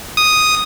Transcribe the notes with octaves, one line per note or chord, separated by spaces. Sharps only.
D#6